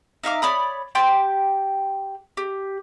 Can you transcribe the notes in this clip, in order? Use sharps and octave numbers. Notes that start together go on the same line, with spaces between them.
D#4 E5 F5 D6
C#5 D5 B5 D#6
G4 G5 A5 C6
G4